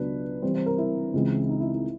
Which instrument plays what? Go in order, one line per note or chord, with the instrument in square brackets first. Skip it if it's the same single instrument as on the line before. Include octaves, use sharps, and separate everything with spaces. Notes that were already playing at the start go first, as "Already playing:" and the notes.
Already playing: [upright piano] C#2 B2 F#3 B3 D4 B4
C3 E3 G3 C4 C5
C5
A#4
E4
C#2 C#3 E3 G#3 C4
D#4
E4
E4